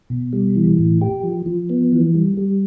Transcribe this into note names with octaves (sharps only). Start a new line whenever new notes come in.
B2
G3
E3
A2
G4
F3
F3
B3
E3
G3
G3